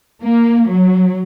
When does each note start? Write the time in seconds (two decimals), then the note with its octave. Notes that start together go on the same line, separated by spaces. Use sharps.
0.23 A#3
0.71 F#3